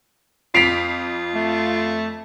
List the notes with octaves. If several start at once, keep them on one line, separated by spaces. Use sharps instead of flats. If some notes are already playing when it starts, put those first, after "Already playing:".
F2 F4 B6 C7 D7 F7
A3